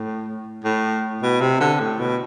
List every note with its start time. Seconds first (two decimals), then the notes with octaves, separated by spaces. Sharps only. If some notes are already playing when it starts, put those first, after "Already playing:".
Already playing: A2
0.64 A2
1.22 B2
1.41 C3
1.60 D3
1.79 A2
1.99 B2